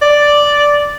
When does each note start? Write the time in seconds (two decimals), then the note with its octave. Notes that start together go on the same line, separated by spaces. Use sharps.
0.02 D5